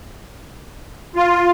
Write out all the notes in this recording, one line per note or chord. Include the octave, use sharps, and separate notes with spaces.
F4